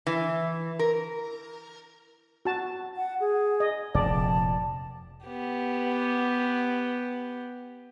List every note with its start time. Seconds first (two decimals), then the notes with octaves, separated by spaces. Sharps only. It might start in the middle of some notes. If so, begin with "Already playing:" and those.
0.07 E3
0.79 A#4
2.45 F#4 A5
2.96 F#5
3.20 G#4
3.60 D#5
3.95 F1 A#2 D5 A5
5.25 B3 G4